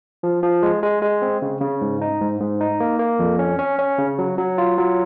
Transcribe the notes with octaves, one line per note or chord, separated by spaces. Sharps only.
F3
F3
G#3
G#3
G#3
C4
C#3
C#3
G#2
D#4
G#2
G#2
D#4
A#3
A#3
F2
C#4
C#4
C#4
C#3
F#3
F#3
F4
F#3